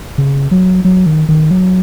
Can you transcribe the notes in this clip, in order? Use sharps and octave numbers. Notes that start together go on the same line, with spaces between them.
C#3
F#3
F#3
D#3
D#3
F#3